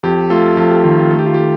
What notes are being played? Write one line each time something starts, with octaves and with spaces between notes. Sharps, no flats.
F2 G4
A3 F4 A4
F2 F4 A4
G4
D#3 F4
F4
A3 A4
G4
F4
A3 G4